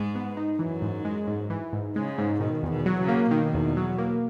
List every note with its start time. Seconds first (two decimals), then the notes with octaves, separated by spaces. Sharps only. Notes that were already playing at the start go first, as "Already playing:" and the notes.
Already playing: G#2 G#3
0.15 B3
0.37 D#4
0.59 F#2 E3 F#3
0.82 G#2
1.05 G#3
1.27 G#2
1.50 E3
1.73 G#2
1.96 C#3 G#3
2.18 G#2
2.41 B2 D#3
2.63 E2
2.70 B2
2.86 F#3
3.00 C#3
3.08 A#3
3.30 B2 D#3
3.54 E2
3.77 F#3
3.98 A#3